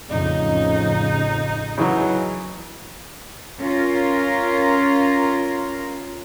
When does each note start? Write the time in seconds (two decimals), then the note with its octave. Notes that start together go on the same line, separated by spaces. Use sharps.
0.10 A1 F2 C#3 D#4
1.78 C#3 E3 F#3
3.60 C#4 F4 A#4